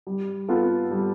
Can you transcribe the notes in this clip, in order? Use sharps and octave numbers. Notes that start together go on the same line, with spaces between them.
G3
B3 F4 A4
G3